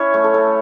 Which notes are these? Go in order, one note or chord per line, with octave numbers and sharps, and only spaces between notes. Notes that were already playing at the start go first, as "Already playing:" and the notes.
Already playing: C#4 E4 C#5 E5
A3
A4
A3